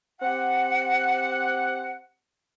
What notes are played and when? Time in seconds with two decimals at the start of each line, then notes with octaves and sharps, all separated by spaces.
0.21 C4 G4 F#5